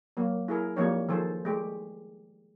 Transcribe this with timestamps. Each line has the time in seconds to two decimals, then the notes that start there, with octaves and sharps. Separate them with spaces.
0.17 F#3 A#3
0.48 E4 G#4 A#4
0.76 F3 G3 A#3 C4 D#4 C#5
1.09 D#3 F3 G#4 A4 C5
1.45 G#3 A3 G4